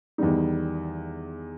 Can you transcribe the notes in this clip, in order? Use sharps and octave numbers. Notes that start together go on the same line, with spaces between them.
E2 D#3 G3 D#4